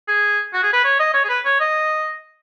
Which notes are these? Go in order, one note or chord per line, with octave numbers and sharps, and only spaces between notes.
G#4
F#4
G#4
B4
C#5
D#5
C#5
G#4
B4
C#5
D#5